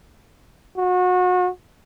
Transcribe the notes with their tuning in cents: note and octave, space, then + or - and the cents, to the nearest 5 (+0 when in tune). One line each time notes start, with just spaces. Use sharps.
F#4 -30